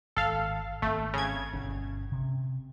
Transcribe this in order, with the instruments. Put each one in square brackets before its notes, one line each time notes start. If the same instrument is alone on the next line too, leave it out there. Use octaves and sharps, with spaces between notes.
[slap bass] G#1 [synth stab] A4 F5
[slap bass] G#1 C4 [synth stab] A3
[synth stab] C#3 G#6
[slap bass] G1 B2 C#4
C3